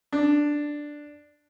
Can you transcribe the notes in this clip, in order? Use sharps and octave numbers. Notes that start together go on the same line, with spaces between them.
D4